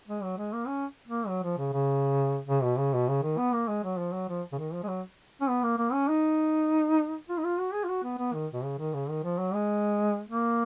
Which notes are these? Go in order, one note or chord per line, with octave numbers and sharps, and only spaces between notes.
G#3
F#3
G#3
A#3
C#4
A#3
F#3
F3
C#3
C#3
C#3
B2
C#3
B2
C#3
D#3
B3
A#3
G#3
F#3
F3
F#3
F3
C#3
D#3
F3
G#3
F#3
C#4
B3
A#3
A#3
C#4
D#4
F4
D#4
F4
F#4
G#4
F4
F#4
B3
B3
D#3
B2
C#3
D#3
C#3
D#3
F3
F#3
G#3
A#3